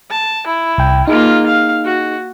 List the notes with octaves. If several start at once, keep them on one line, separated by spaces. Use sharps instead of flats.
A5
E4
C2 G5
A#3 D#4 F4 G#4
F5
F#4